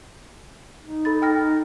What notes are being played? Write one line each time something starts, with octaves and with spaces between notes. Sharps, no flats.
D#4
A4 B5 A6
G5 F6 A#6